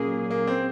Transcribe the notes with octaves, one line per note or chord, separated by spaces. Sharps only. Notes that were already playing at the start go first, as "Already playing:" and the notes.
Already playing: A#2 F#3 A#3 C#4 G#4
A#3
C4